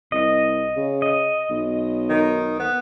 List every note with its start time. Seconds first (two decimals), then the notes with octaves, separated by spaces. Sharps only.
0.12 C2 D#5
0.76 C#3
1.02 D#5
1.50 B1
2.09 D#3
2.59 B3